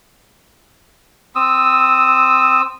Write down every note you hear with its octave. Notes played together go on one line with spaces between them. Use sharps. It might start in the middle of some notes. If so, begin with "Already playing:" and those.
C4 D#6 E6